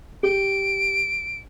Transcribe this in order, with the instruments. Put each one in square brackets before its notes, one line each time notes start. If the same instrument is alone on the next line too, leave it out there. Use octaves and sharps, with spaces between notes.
[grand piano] G4 [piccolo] D7